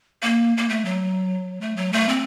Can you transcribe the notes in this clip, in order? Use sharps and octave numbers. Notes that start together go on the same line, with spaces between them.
A#3
A#3
A3
F#3
A3
F#3
A3
C4